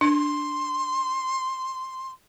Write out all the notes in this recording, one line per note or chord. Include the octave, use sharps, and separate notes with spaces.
D4 C6